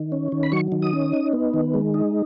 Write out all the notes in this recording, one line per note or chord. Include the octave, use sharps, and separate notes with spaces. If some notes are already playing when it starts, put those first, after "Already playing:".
Already playing: D#3
C#4
D#3
B5
F#3 C#6
D#3
D#6
C#4
D#4
B3
D#3
G#3
D#4